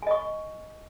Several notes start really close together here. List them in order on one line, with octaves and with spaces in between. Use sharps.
G#5 D#5 C#6